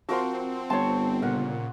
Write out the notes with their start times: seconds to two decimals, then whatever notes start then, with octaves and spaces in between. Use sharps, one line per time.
0.09 F3 C4 F#4 A#4 F#5 C6
0.70 G1 C#5 A5 C6 C#6
1.22 A#2 C#3 A#4 F#5